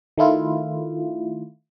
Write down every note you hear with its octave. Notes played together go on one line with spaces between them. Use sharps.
D#3 A3 E4 F4